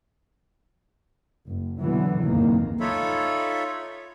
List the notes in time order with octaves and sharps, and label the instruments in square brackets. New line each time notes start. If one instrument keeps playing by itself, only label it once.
[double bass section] F#1
B2 D3 E3 F#3 B3
F#1 B1 F2 G#2 D#3 A#3
[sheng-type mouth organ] D#4 F4 A4 C#5 E5 B5